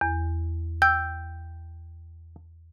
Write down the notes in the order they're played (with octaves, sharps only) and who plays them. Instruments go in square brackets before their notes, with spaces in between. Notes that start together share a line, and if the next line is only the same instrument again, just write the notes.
[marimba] E2
[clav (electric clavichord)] G5 [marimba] E6